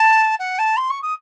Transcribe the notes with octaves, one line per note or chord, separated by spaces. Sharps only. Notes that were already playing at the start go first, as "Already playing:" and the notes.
Already playing: A5
F#5
A5
C6
C#6
D#6